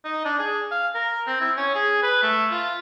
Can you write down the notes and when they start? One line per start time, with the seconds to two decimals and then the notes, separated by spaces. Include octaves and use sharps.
0.05 D#4
0.25 D4
0.39 G#4
0.71 F5
0.95 A#4
1.27 C4
1.40 E4
1.57 C#4
1.75 G#4
2.03 B4
2.23 A3
2.51 F4